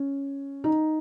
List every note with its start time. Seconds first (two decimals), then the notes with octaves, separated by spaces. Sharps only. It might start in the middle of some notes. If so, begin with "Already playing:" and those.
Already playing: C#4
0.64 D#4